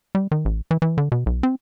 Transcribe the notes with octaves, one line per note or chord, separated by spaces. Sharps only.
G3
D#3
A1
E3
E3
D3
B2
B1
C4